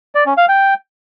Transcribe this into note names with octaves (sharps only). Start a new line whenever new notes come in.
D5
C#4
F5
G5